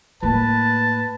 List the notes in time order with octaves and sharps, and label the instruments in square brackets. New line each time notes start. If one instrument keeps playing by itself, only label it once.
[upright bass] A2 A#3 [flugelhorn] B4 [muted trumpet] A5